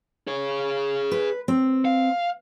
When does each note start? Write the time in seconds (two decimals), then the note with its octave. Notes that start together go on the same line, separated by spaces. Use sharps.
0.27 G#4 C#5
1.11 B4
1.48 C4
1.85 F5